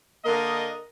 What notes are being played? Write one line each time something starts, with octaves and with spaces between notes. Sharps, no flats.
D3 A#3 A#4 D#5